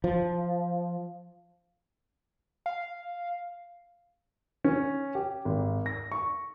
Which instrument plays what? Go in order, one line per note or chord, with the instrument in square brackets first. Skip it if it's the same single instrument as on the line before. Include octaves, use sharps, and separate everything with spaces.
[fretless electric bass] F3
[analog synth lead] F5
[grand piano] C#4
G4
G#1
A#6
C#6